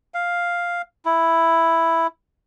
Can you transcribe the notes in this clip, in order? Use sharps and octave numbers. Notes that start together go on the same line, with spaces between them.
F5
E4